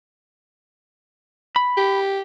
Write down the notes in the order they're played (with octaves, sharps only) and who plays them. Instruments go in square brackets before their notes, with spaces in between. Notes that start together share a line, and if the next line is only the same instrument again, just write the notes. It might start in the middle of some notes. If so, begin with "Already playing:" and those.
[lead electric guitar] B5
[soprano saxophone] G4